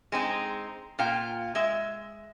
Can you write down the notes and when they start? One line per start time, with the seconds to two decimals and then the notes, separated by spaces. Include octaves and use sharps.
0.12 G#3 C4 D#4
0.99 A#2 F4 F5 G5
1.55 G#3 E5